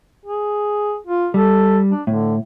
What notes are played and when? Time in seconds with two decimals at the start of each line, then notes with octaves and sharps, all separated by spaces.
0.25 G#4
1.07 F4
1.34 G3 A4
1.91 D4
2.07 A2 D3